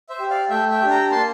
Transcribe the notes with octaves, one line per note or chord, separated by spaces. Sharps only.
C5 E5
G4
D5 F5
A3 E5 G5
E5 G5
D4 G4
G5 A#5
A#3 A5 C6